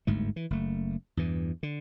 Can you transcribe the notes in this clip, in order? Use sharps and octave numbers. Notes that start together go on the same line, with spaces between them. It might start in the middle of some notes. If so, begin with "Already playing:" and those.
G1 D2 G#2 A3
E3
F#1 A3
E2 G2 E3
D3